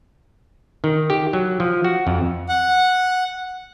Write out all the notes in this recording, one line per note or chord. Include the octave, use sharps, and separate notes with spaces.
D#3
G4
F#3
F3
F#4
F2
F#5